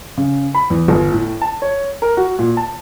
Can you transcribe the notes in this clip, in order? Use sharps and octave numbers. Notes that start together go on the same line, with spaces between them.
C#3
B5
E2
G1
A2
A5
C#5
A#4
F#4
A#2
A5